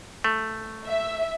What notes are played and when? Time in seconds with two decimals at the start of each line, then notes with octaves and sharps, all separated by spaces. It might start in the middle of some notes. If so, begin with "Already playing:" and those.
0.24 A3
0.87 E5